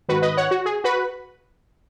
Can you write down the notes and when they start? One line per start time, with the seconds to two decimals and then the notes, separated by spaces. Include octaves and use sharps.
0.08 G#2 D#3 F#4 B4
0.22 B4 D#5
0.37 C#5 F#5
0.51 F#4
0.66 G#4
0.84 F#4 B4